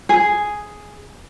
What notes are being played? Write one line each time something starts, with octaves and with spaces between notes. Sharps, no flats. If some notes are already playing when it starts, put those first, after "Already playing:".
G#4